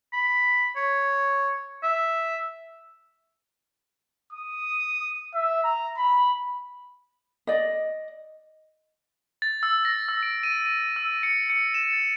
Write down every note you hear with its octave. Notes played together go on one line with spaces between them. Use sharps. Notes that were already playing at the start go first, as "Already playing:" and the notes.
B5
C#5
E5
D#6
E5
A#5
B5
D5 D#5
A6
E6
A#6
E6
D7
D#7
D#7
E6
C#7
C#7
E7
A6